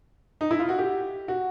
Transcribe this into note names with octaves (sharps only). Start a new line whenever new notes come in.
D#4
E4
F4
F#4
G4
F#4